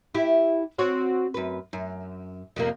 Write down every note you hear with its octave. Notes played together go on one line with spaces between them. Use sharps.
E4 G4
C4 F#4 C#5
F#2 B4
F#2
F2 C3 A#3